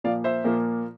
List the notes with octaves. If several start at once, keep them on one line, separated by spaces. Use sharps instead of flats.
A#2 F3 A#3 D5 F5
C5 E5
A#2 F3 A#3